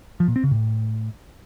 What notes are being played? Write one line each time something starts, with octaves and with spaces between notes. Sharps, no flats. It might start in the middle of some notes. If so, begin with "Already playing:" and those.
F3
A#2
C4
C#3
A2